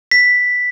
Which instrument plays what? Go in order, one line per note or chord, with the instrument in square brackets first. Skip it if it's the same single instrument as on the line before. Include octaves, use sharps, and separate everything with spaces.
[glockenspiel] B6